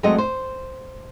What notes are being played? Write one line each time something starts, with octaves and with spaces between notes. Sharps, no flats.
F#3 G#3 A3 C4 D#5 F#5
C5